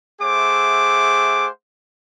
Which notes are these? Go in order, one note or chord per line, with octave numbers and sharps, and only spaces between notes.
A3 G#4 C5 E5 F#5 D6